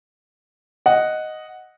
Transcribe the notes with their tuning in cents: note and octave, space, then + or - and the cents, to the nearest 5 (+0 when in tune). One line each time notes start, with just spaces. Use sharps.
D#5 +0 F#5 +0